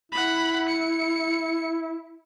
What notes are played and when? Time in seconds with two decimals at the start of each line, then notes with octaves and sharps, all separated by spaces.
0.12 E4 F#5 B5
0.69 C#7